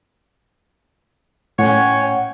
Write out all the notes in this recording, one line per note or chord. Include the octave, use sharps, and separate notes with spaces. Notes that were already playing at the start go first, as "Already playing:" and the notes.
A2 C#4 C#5 F#5 G5